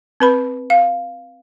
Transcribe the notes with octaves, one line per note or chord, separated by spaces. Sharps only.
C4 B4 B5
F5